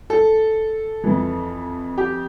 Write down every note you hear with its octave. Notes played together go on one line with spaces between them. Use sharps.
A4
F2 E3
G4